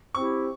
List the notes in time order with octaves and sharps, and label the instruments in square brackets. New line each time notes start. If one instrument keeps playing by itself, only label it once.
[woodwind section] C4 E4 G4 [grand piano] C#6